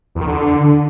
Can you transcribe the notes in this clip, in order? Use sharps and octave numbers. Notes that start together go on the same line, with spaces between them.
E2
D#3
D3